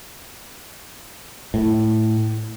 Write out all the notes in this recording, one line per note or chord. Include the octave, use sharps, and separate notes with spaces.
A2